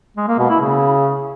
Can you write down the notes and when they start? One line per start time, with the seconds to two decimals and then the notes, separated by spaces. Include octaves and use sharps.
0.17 G#3
0.28 A#3
0.39 B2
0.49 E4
0.60 C#3